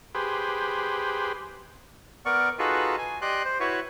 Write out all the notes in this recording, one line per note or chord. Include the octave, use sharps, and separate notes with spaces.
G4 G#4 B4 C5
B3 A#4 D5 C#6
D#4 F4 F#4 G#4 A4 B4
G#5
G4 D5 D#5 C6 F#6
C5
E4 F#4 B4 C#5